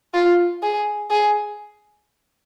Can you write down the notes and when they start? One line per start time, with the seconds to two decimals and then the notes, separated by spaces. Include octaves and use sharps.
0.14 F4
0.63 G#4
1.11 G#4